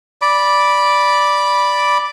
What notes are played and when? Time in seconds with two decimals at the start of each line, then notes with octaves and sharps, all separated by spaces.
0.22 D5 B5 D6